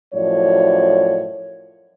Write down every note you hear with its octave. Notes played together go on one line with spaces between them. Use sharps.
F#2 A2 F3 F#3 C#5 D5